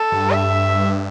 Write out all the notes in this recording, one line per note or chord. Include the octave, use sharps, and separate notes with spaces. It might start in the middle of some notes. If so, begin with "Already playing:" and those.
Already playing: A4
G2
E5